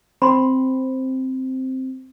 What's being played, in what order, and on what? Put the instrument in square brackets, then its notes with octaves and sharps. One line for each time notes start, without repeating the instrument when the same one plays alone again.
[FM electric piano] C4 [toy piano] B5 C6